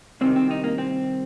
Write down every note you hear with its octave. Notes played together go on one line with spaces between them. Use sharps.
C2 C3 D#3 C4
C4
D#4
A#3
C4